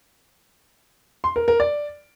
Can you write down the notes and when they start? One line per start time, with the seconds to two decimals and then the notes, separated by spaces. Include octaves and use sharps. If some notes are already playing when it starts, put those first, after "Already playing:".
1.24 C6
1.36 A#4
1.48 A#4
1.60 D5